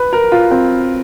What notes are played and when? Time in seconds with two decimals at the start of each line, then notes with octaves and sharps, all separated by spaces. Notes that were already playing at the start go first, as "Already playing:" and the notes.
Already playing: B4
0.13 A#4
0.32 F4
0.51 C4